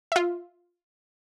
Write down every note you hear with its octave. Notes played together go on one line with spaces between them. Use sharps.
F4 E5